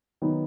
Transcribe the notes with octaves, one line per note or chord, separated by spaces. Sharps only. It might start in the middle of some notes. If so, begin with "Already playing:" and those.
D#3 F#3 B3